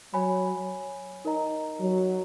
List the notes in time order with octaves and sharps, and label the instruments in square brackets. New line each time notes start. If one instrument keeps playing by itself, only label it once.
[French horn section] F#3 [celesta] C#5 G#5 B5
[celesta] D#4 A#4 D#5 A#5
[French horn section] F#3